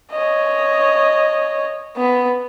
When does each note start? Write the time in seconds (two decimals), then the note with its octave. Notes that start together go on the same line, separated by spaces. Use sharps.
0.12 C#5 D#5
1.97 B3